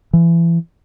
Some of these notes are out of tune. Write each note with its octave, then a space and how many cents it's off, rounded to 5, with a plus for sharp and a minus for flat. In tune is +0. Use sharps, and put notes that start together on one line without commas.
E3 +30